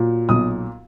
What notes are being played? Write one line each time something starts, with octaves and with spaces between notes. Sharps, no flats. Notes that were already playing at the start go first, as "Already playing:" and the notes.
Already playing: A#2 F#3
B1 D#6